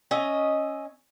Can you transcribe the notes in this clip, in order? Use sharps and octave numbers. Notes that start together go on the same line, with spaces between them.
C#4 D#5 E5